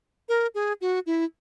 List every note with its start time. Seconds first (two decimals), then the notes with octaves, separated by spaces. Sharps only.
0.29 A#4
0.55 G#4
0.81 F#4
1.06 E4